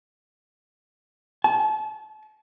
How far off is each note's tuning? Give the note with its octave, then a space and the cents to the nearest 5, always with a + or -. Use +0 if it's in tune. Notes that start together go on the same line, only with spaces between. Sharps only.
A5 -35